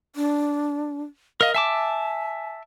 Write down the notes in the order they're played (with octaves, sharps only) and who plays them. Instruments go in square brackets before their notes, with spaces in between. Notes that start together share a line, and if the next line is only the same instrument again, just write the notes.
[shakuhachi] D4
[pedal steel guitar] A#4 D#5 [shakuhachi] F5
[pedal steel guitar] E5 A5 D6 [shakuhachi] G#5